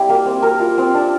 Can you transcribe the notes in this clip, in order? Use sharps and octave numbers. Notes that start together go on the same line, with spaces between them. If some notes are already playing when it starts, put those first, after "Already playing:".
Already playing: G3 C4 E4 G4
A#3
C4
A#4
F4
C4
D4